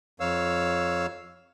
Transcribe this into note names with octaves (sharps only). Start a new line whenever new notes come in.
F2 C#5 F5 E6